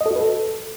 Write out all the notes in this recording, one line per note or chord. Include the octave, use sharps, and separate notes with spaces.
D#5
A4
F#4
B4
A4